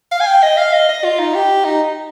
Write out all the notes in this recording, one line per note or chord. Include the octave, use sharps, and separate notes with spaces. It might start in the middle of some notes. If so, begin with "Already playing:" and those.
F5
G#5
G5
D#5
F5
D#5
D#5
F4
D#4
G4
D#4